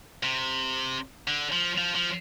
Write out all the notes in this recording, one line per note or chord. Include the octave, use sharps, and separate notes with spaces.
C3
D3
F3
F3
F3